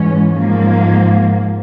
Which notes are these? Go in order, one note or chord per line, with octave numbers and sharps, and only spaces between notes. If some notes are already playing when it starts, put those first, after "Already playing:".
Already playing: G#2 E3 G#3 C#4
G#2 F3 A#3